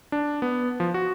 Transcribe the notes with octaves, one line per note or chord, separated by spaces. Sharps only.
D4
B3
F3
F#4